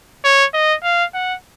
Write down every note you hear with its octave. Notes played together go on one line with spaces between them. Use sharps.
C#5
D#5
F5
F#5